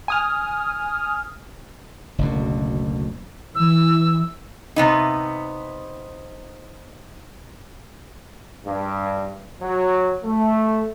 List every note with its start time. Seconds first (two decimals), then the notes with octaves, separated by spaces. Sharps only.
0.08 G#5 D#6 F6
2.18 F#1 D2 B2
3.55 E3 E6
4.76 C3 B3 D#4
8.66 G2
9.61 F#3
10.23 A3